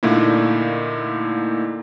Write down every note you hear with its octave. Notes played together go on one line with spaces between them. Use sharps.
A#2 D3 A3 A#3 D#4 E4